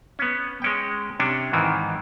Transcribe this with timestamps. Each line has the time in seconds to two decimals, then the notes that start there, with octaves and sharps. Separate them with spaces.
0.19 B3 C#4
0.62 G#3 C#4 G5
1.20 C3 C#4 D4
1.53 G#2 D#3 E3